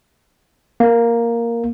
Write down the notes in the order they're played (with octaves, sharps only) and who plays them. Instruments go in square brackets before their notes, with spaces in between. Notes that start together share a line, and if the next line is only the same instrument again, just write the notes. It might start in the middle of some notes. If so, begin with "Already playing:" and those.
[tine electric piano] A#3